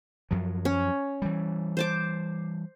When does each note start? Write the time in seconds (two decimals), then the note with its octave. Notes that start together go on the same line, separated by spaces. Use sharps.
0.31 F#2 F3 F#3
0.65 C#4
1.22 E3 G3
1.77 C5 A5 D6